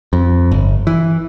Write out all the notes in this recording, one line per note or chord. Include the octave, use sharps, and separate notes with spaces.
F2
G1
E3